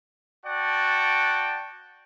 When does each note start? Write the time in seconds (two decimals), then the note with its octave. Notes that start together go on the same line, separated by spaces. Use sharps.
0.45 F#4 D5 F#5 G5 A5